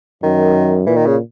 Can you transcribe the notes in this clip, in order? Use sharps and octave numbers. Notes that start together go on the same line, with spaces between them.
F#2 D#3
A#2 E3
D#3
C#3